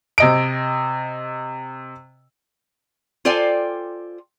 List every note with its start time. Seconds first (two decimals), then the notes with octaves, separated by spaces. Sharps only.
0.18 C3 D#5 D7
3.25 F4 A4 C5 D5 G5 G#5